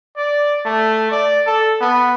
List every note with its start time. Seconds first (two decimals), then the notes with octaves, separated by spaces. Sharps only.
0.17 D5
0.65 A3
1.11 D5
1.46 A4
1.81 B3